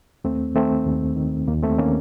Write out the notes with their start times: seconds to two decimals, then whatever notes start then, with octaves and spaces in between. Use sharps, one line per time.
0.24 D#2 A3 C4
0.55 D#3 A3 C4
0.86 D#2
1.16 D#3
1.48 D#2 A#3
1.62 A3 C4
1.78 D#3 A#3 C#4